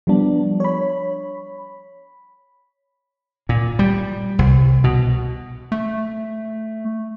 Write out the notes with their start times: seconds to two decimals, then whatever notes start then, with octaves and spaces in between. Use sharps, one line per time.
0.07 F3 G3 B3 D4
0.60 C#5 B5
3.49 A#2
3.79 G3
4.39 C2
4.84 B2
5.72 A3